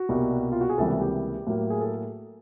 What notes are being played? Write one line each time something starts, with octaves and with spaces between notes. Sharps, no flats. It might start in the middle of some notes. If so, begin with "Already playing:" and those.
Already playing: F#4
C2 B2 G3 A#3
F4
F#4
G#4
C#2 C3 E3 G3 A#3 A4
G4
A2 F#3 A#3
G#4
A4